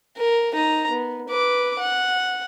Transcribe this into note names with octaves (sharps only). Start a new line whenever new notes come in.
A#4
D#4 A#5
B3
B4 D6
F#5